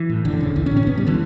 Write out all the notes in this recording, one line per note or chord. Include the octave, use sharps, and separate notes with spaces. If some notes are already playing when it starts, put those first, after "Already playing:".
Already playing: E3
A2
F#1 D3
E2 C#3
B1 E3
C#4
A2
C#4
G1 B3
G3
D3 E3